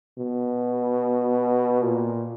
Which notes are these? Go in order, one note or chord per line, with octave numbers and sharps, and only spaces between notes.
B2
A#2